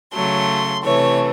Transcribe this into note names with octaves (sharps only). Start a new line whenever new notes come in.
C#3 F#3 A3 C6
C3 E3 A3 C#5